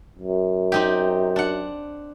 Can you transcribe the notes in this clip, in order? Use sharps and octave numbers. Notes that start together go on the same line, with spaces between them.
F#2
C4 D#4 G4
D4 F#5